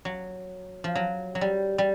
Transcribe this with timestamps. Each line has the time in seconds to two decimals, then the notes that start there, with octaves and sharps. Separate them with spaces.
0.05 F#3
0.84 F3
0.95 F#3
1.35 F#3
1.41 G3
1.78 G3